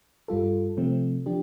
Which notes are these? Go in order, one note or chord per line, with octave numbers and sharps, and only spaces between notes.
G2 G3 F4 A4
C3 F3 A3 C4
F3 D4 G4